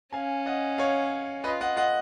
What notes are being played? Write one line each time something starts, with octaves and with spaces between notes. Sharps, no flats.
C#4 F5 G#5
D#5 F#5
C#5 F5
F4 B4 D#5
D#5 F#5
D#5 F#5